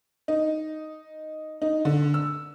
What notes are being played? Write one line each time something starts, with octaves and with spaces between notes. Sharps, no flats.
D#4
D#4
D3
E6